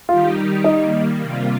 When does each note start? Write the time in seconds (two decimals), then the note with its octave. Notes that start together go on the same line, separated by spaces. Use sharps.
0.09 D#3 G3 D#4 F4 G4
0.64 D#3 G3 A#3 D#4
1.20 C3 G3 A#3 F4